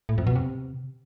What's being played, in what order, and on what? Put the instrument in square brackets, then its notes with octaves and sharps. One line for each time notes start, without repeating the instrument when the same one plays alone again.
[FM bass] A2
F2
B2
C3